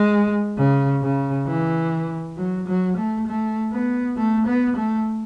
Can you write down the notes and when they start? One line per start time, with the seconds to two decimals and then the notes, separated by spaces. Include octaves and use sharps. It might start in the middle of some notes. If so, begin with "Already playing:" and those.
Already playing: G#3
0.57 C#3
1.02 C#3
1.47 E3
2.37 F#3
2.68 F#3
2.97 A3
3.27 A3
3.72 B3
4.17 A3
4.47 B3
4.77 A3